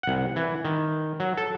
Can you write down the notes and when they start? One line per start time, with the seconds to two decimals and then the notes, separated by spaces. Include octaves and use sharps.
0.03 C2 F#5
0.36 E3
0.65 D#3
1.20 F#3
1.37 A4